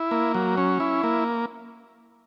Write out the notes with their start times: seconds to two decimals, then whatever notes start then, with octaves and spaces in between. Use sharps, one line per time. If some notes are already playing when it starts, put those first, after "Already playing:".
Already playing: E4
0.11 A#3
0.34 F#3
0.58 C#4
0.80 E4
1.04 A#3